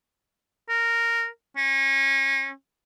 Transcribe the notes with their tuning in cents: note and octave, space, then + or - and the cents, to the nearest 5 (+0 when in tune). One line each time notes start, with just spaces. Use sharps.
A#4 -10
C#4 -30